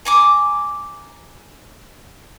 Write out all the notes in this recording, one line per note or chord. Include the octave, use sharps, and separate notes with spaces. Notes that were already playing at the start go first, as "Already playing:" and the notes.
G#5 A#5 D6